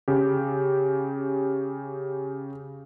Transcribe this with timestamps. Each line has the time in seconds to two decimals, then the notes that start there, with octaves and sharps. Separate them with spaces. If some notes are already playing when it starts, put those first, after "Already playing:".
0.08 C#3 G4